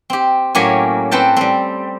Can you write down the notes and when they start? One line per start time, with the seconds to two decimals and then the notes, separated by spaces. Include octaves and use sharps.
0.10 C4 G4
0.55 A2 F#3 A#3 C#4 G4 G#5
1.11 C4 A4 B4 G5 A5
1.37 G3 C4